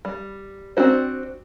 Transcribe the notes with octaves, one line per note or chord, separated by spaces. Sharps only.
G3
C4 D4 F#4 C5